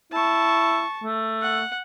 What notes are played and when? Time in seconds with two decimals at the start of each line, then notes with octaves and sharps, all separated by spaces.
0.12 E4 A5 C#6
1.04 A3
1.42 F#5